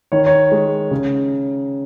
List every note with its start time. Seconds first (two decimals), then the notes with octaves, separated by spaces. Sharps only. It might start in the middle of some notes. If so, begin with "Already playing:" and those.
0.12 D#3 C#5
0.27 C#5
0.52 G#3
0.91 C#3